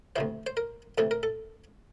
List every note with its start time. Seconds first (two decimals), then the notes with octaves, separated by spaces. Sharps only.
0.16 D2 C3 E3 C5
0.47 C5
0.57 A#4
0.98 D2 C3 E3 A4
1.11 A#4
1.23 A4